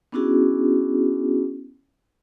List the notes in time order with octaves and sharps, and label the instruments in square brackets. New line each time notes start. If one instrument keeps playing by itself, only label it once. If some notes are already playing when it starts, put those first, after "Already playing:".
[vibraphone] B3 C#4 D4 E4 F#4 G#4